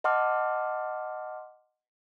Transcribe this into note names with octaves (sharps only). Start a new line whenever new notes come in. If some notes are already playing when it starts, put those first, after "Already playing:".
D#5 F#5 A5 C6 D6 F6